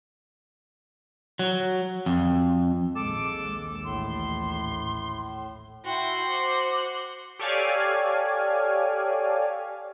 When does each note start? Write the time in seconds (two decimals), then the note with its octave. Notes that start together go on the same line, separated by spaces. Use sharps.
1.39 F#3
2.06 F2
2.95 A#1 D#2 G#3 A4 A5 D6
3.85 A1 A2 C6
5.85 E4 F#4 G5 C6
6.27 C5 D6
7.39 G4 A4 C#5 D5 F5 G#5